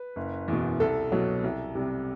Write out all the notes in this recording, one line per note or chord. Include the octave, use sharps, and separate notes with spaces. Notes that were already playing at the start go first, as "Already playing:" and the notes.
Already playing: B4
F#1
E2 B2
C2 A4
B2 F#3
C2
C3 G3